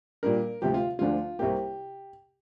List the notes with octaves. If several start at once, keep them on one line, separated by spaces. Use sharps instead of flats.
A#2 G3 D4 A#4
D2 C3 F3 G4
F4
D2 D3 F3 D4 F4
C2 C3 A#3 G4